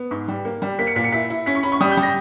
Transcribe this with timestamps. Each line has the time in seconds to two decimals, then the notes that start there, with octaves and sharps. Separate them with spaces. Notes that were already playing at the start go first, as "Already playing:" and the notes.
Already playing: B3
0.11 G#2
0.28 G3
0.45 A#3
0.62 G3
0.79 A#3 B6
0.87 C#7
0.96 A#2 B6
1.04 C#7
1.12 E4 B6
1.30 E4
1.46 C#4 B6
1.55 C#6
1.63 C#4 B5
1.72 C#6
1.80 G3 D#6
1.92 G6
1.97 G3
2.03 A#6